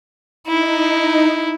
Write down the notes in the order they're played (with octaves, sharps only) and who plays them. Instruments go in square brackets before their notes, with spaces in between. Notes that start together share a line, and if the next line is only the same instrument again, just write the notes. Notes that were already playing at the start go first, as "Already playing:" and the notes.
[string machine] D#4 [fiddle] E4